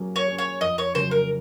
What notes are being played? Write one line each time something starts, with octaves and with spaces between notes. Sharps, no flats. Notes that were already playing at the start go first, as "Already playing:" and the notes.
Already playing: F#3 A#3 C#4 G#4
C#5
A#3 C#4 G#4
C#5
F2 D#5
C#5
C#3 F#3 A#3 C5
A#4